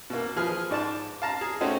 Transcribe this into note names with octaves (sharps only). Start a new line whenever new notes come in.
B2 A#3
F3 G#4 B4 F6
G#2 D5 A5
F5 A5 A#5
G#4
A3 C4 C#4 D#4 F#4